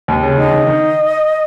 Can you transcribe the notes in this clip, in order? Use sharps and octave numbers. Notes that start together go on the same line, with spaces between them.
D#2
C#3
D#3 D#5
D#3
D#3